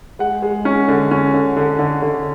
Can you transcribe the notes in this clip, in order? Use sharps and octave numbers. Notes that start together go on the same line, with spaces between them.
G#3 F#5
G#3
C#4
D3
C#4
D3
D3
D3
D3